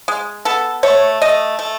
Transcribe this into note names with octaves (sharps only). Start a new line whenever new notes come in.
G#3
B3 A4
A3 C#5
A3 D#5
A3